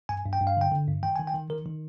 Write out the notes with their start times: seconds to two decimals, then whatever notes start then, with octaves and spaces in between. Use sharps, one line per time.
0.09 G2 G#5
0.25 G2
0.33 G5
0.41 G2
0.47 F5
0.57 D3 G5
0.72 D3
0.88 G2
1.03 D#3 G5
1.16 D#3 G#5
1.27 G5
1.34 D#3
1.50 D#3 A#4
1.66 D#3